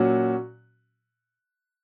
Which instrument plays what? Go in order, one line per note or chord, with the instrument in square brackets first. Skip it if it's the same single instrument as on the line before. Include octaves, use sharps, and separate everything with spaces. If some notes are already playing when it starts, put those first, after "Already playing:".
Already playing: [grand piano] A#2 F#3 C#4 F#4